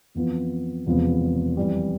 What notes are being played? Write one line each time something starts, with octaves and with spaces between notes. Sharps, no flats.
F2 E3 B3 F4
E1 E2 C3 F3 B3
F2 E3 G3